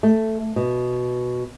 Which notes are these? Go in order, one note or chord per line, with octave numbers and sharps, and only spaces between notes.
A3
B2